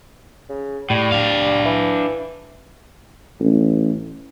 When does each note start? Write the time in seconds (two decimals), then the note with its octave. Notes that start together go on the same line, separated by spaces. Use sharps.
0.49 C#3
0.90 A2 G3
1.12 D4 F5
1.65 E3
3.39 A1